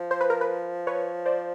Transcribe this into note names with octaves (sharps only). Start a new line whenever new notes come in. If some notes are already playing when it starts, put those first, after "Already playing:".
Already playing: F3
C5
B4
A#4
B4
B4 C#5
C5 D5